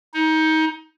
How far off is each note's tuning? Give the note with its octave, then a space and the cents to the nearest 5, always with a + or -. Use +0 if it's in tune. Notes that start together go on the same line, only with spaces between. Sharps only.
D#4 +25